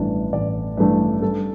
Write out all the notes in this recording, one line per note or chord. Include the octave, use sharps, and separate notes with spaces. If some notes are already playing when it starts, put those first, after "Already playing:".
Already playing: A1 G2 E3 A3 D4
A1 D5
G2 E3 A3 D4 B4
G2 A4